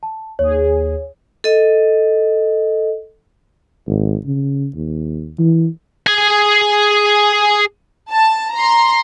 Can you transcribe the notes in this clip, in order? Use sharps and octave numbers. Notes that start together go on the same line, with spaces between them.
A5
D#2 G#4 C#5
A4 D#5
G#1
C#3
D#2
E3
G#4 G#5
A5
A#5 C6